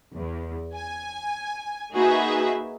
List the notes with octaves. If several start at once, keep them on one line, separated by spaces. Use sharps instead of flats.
E2
G#5
A#3 D#4 F#4 G#4 B4 E5